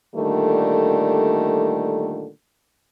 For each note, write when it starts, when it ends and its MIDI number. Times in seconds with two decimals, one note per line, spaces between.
0.15 2.29 46
0.15 2.29 50
0.15 2.29 51
0.15 2.29 55
0.15 2.29 57